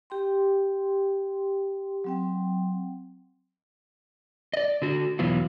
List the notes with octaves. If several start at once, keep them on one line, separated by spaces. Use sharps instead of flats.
G4 G5 C6
F#3 C4 G5
D5 D#5
D3 F#4
E2 B2 E3 F#3 B3 F4